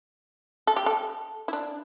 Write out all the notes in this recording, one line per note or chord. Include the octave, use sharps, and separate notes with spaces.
A4
G4
A4
E4
D4